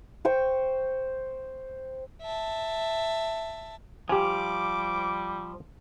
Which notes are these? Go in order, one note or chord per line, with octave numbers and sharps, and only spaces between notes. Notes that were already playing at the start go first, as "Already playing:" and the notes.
C5 G5 C#6
E5 A5
F3 G3 G4 G#5 D6